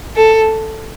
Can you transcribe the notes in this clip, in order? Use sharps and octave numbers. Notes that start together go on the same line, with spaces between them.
A4